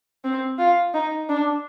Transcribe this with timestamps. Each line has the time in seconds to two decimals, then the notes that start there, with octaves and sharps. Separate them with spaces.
0.25 C4
0.59 F4
0.94 D#4
1.29 D4